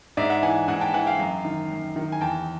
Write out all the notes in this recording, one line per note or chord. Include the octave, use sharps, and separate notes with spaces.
G#2 D5 E5
E5 F#5
E3 F#5 G#5
G#2 F#5 G#5
G5 A5
E3 F#5 G#5
F5 G5
F#2
D#3
F#2
D#3
G#5
E2 G5 A5